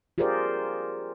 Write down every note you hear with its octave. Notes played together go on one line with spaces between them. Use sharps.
F4 G4 G#4 A#4 C5 D5